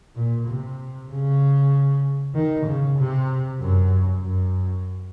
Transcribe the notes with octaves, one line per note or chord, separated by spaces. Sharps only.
A#2
C3
C#3
D#3
C#3
C3
F#2
F#2